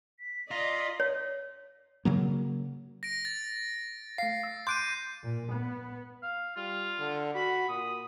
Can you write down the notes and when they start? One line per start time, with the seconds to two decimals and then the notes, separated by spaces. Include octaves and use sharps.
0.20 B6
0.51 F4 D5 D#5 A#5
1.00 C#5
2.05 C#3 F#3 A#3
3.03 A#6 D7
3.25 A6
4.18 A3 F5 C7
4.43 E6
4.67 C6 D6 F#6 G6 D7 D#7
5.23 A#2
5.52 B3
6.23 F5
6.56 G3 F4
7.00 D3
7.35 F#4 B5
7.69 A#2 D#6